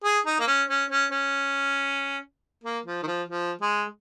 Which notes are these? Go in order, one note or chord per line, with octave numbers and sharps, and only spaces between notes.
G#4
D#4
A#3
C#4
C#4
C#4
C#4
A#3
F3
D#3
F3
F3
G#3